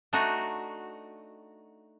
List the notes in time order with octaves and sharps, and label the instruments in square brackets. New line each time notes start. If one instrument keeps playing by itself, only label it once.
[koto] A3 D4 D#4 F#4